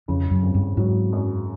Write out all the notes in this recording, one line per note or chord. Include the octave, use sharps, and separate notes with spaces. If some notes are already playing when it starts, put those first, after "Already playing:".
F2 C#3
F#2
G#1
G2
G#2 F#3
F#2